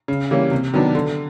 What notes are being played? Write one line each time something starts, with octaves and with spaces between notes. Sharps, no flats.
C#3
E3 G3 A#3 C#4
C3
D#3 F#3 B3 D4
D3